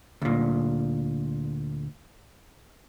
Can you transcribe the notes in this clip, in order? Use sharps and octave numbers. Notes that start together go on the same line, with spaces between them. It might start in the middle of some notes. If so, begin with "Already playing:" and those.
D2 A#2